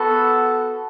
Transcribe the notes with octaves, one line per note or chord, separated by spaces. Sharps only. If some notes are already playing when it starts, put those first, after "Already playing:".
Already playing: B3 F#4 A4